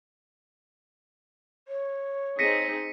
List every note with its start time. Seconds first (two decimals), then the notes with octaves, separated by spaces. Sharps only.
1.68 C#5
2.39 C4 D#4 G#4 A#6 B6 C#7 D#7